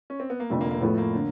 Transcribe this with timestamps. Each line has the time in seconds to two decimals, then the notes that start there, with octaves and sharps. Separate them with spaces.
0.10 C#4
0.20 C4
0.30 B3
0.40 A#3
0.50 F1 F2 D3 A3
0.61 A#3
0.71 A#3
0.81 A2 F3 A3 B3
0.98 A#3
1.15 D3